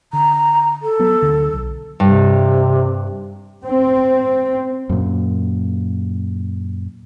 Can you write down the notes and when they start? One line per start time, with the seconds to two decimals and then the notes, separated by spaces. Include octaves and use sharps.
0.13 D3 A#5
0.82 A4
0.99 F#3 B3
1.22 D2 D3
1.53 B1
2.00 G2 C3
3.63 C4
4.89 F#2 A#2